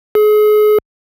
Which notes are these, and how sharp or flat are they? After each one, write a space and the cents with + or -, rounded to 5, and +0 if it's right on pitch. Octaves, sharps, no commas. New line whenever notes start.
G#4 +35